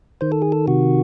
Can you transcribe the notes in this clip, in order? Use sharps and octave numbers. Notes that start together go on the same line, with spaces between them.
D#3 C5
A4
G#4
A4
C3 F#4